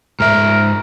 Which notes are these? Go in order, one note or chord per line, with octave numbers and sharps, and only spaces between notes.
G#2 A#4 E5